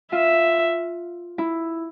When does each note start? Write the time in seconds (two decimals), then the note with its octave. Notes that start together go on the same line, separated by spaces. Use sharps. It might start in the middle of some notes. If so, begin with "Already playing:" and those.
0.12 F4 E5
1.38 E4